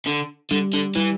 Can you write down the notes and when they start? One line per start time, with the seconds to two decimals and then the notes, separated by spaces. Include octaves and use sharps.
0.06 D3
0.51 D3 G3
0.74 D3
0.96 E3 G3